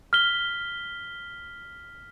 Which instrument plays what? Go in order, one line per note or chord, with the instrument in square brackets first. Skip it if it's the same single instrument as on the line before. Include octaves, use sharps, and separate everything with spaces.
[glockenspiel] F6 B6 G7